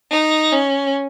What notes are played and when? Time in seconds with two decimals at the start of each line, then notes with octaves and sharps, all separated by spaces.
0.11 D#4
0.52 C#4